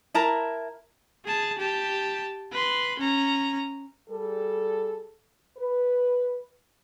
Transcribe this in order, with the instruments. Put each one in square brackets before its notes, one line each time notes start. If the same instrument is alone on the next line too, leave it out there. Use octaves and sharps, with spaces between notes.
[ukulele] E4 A#4 A5 A#5
[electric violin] G#4 A5
G4 A5
B4 C6
C#4 A#5
[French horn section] G3 G#4 A4
B4